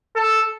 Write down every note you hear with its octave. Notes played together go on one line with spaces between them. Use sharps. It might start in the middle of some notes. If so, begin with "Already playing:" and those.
A4